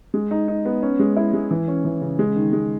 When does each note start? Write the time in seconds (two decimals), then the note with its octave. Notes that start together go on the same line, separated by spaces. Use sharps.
0.14 G#3
0.31 D#4
0.48 D#4
0.65 B3
0.82 C#4
1.00 G#3
1.17 E4
1.34 G#3
1.51 E3
1.68 C#4
1.85 E3
2.01 C#3
2.19 G#3
2.36 D#3
2.53 G#3